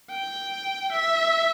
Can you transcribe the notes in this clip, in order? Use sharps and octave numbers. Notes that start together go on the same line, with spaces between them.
G5
E5